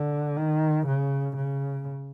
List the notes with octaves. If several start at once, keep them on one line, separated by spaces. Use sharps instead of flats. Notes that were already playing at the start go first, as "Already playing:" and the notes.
Already playing: D3
D#3
C#3
C#3